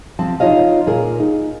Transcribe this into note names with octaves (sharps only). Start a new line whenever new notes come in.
F3 C4 A5
D#4 F4 C#5 D#5 F5
A#2 G#4 A#4
D#4